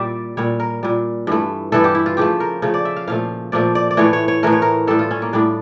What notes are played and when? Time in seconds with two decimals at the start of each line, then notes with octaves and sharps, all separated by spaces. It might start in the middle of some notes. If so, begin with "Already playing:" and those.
Already playing: A#2 G3 D5 E5
0.37 A#2 G3 C#5
0.60 A#4
0.83 A#2 G3
1.27 G2 E3 A3
1.72 G2 E3 A3 A4
1.84 G4
1.95 E4
2.06 F4
2.17 C#3 F3 A3 G4
2.40 A#4
2.62 C#3 F3 A3
2.74 D5
2.85 E5
2.96 F5
3.08 A#2 F3 A3 F5
3.52 A#2 F3 A3 D5
3.75 D5
3.91 D5
3.97 A2 E3 A3 C#5
4.13 C#5
4.28 C#5
4.43 A2 E3 A3 A#4
4.52 C#5
4.62 A#4
4.87 A2 G3 A4
4.99 F4
5.11 C#4
5.22 A#3
5.33 A2 G3 D4